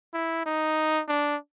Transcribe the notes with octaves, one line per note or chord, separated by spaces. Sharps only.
E4
D#4
D4